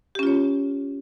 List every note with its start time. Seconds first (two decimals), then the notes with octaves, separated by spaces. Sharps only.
0.15 G4
0.19 C#4
0.23 F4
0.27 C#5